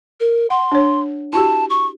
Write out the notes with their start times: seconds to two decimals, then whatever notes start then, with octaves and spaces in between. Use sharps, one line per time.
0.20 A#4
0.50 F#5 C6
0.72 D4 C#5
1.33 E4 F#4 G4 A5
1.70 C#6